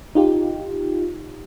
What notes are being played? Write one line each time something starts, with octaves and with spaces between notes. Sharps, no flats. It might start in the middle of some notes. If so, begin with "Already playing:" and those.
D#4 F4 G4